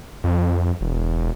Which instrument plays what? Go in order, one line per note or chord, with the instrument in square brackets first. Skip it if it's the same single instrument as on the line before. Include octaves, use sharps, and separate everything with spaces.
[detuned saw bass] F2
E1